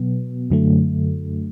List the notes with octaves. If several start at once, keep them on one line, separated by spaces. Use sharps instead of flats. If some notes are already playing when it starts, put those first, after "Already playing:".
Already playing: B2 F#3 B3
F#2 D3 F#3 A3